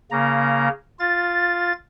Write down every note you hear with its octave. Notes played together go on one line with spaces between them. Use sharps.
C#3 A#3 A#5
F4 A6